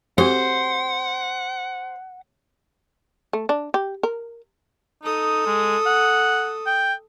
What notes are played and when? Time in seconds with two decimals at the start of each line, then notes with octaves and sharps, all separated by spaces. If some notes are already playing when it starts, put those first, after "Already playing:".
0.18 C4 F#4 G4 C5 F#5
3.33 A3
3.49 D4
3.74 G4
4.03 A#4
5.03 D#4 A4 D#6
5.46 G#3
5.86 F#5
6.66 G5